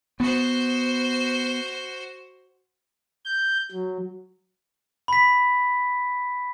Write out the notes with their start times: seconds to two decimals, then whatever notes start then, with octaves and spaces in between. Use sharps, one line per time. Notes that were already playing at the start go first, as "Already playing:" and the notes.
0.20 B3 F#4 C5
3.25 G6
3.72 F#3
5.08 B5 B6